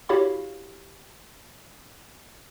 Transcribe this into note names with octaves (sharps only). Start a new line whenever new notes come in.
E4 F#4 G4 C#5 F5 B5